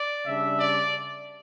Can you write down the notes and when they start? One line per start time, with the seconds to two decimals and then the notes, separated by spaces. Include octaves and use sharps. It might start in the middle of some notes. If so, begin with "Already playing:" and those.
Already playing: D5
0.25 C#3 G3 D4 E5
0.60 D5